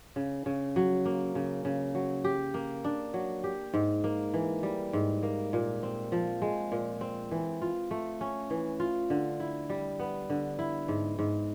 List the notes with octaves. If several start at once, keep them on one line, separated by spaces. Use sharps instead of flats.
C#3
C#3
F#3
A#3
C#3
C#3
F#3
G4
A#3
D4
F#3
G4
G#2
A#3
E3
G3
G#2
A#3
A#2
C4
F3
G#3
A#2
C4
E3
F4
A3
C#4
E3
F4
D3
E4
G3
B3
D3
E4
G#2
G#2